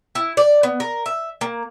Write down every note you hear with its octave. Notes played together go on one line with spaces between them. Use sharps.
E4
D5
B3
A#4
E5
A#3